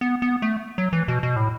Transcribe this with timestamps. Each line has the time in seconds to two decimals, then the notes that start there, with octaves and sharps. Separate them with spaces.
0.01 B3
0.22 B3
0.42 A3
0.78 F#3
0.93 E3
1.08 B2
1.23 B2
1.36 A2